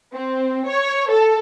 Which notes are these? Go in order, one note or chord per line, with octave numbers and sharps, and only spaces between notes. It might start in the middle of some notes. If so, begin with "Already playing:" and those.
C4
C#5
A4